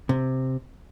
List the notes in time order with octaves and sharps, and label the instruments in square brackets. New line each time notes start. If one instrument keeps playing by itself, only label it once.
[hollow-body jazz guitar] C3